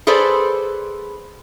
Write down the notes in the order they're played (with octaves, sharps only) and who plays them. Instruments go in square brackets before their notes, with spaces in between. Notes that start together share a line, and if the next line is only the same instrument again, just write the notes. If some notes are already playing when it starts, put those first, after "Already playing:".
[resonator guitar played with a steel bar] G#4 A4 B4 C5 D5